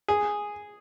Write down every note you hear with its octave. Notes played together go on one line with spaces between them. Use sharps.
G#4